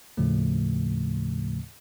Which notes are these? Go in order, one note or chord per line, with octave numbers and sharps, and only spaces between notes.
D#2 A2 C#3 F3 A3